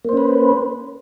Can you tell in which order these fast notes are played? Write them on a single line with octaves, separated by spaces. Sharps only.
A#3 C5 C#4 B4